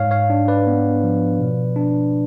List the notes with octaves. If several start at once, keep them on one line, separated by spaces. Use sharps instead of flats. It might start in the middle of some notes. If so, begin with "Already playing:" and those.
Already playing: G#2 C#5 F5
C#5 F5
D4
B4 D5
B3
F3
B2
D4